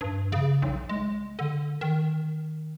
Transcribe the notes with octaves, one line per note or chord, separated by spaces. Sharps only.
G2
C#3
B1
G#3
D3
D#3